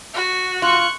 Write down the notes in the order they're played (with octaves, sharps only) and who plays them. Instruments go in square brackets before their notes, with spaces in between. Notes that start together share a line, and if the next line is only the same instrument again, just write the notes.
[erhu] F#4
[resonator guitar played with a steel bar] F4 [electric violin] C#6 F#6